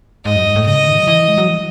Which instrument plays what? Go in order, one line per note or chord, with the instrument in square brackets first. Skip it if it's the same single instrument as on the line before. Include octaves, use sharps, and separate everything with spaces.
[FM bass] G#2 [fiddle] D#5
[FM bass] F#2
G#2
A2
[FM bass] C#3 [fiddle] D#5
[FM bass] D#3
F#3
E3
G#3
F#3
E3